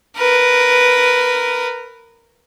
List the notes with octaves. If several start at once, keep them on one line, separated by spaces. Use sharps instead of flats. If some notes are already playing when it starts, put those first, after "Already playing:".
A#4 B4